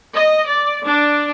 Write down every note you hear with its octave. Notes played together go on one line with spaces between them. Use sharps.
D#5
D5
D4